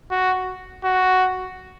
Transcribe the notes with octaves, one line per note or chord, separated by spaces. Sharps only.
F#4
F#4